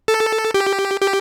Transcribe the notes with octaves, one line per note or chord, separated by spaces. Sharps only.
A4
G4
G4